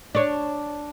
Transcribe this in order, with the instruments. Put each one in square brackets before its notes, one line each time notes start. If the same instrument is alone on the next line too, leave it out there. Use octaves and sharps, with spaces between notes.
[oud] D4 C#5